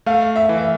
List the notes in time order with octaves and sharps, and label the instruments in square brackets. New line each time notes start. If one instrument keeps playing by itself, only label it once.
[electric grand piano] A3 [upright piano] F5
[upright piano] E5
[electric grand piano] E3
[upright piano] E5